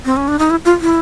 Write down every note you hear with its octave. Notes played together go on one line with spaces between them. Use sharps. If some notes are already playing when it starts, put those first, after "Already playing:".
C4
C#4
D4
D#4
E4
F4
E4